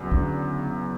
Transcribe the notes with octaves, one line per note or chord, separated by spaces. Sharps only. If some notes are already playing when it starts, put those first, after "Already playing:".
Already playing: E2 C#3 F#3
D3